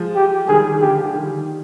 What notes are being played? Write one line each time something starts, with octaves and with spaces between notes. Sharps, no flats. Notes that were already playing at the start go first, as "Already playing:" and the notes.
Already playing: F3 G#3
G4
D#3 G3 G#4
D3 F3 G4
D#3 G3